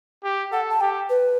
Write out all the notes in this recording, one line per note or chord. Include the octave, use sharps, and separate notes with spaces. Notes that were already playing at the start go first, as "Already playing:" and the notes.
G4
A4 F#5
A5
G4 G5
B4